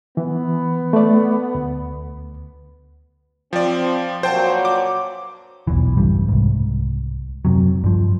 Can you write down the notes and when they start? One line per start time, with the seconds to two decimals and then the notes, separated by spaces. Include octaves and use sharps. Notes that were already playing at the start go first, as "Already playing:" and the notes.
0.17 E3 B3
0.93 A3 D5
1.55 D2
3.53 F3 C4 D5
4.23 G2 A#2 F#3 C5 G5 A5
4.65 D6
5.67 B1 E2 E3
5.97 G2 C#3 G3
6.29 C2 G#2
7.45 F#2 C3 F#3
7.84 G2 F3